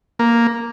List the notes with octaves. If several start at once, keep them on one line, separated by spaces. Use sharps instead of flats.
A#3